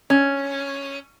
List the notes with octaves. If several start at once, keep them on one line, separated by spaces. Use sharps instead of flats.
C#4